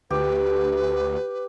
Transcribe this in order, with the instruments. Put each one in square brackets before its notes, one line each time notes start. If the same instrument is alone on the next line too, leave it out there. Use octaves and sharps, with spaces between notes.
[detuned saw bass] D2 [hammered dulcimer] G4 [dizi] B4